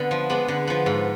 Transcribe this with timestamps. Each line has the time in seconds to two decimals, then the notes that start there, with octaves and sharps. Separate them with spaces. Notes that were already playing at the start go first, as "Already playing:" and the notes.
Already playing: D3 B3
0.11 F3
0.30 G#3 B3 D4
0.48 D3
0.67 F3 B3
0.86 G#2